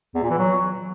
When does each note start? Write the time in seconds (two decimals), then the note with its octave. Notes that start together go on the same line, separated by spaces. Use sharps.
0.15 E2
0.22 A#2
0.30 E3
0.38 F#3